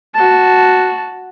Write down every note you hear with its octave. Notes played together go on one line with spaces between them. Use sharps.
F#4 A5